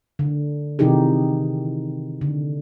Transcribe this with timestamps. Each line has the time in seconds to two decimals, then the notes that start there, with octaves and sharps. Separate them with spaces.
0.19 D3
0.79 C3 D#3 E3 D#4 G4 G#4
2.21 D3